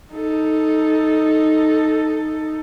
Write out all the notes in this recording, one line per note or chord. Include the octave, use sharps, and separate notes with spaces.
D#4 A4